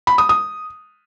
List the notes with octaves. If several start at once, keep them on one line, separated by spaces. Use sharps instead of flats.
B5
D#6
D#6